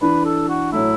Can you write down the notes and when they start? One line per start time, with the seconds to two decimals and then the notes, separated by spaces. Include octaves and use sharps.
0.02 E3 D4 B4
0.25 A4
0.49 F#4
0.72 A2 F#3 A3 E4